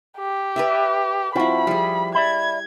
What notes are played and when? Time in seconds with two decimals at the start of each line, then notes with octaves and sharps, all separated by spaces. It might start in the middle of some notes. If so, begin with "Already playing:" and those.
0.18 G4
0.56 B4 D5 E5
1.36 F3 C4 E4 F#4 B5
1.67 F3 G3 G#4
2.15 D5 E5 B5 G#6